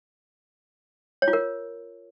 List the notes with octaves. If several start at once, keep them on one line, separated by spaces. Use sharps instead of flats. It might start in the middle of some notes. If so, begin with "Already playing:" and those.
C#5
F4
A#4